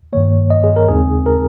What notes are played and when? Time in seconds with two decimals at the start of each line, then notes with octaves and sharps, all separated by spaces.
0.13 G2 D#3 A#3 C#5
0.50 D#5
0.64 G#4
0.76 A#4
0.88 D#2 C#3 G#3 C4 D#4 G#4
1.26 A#4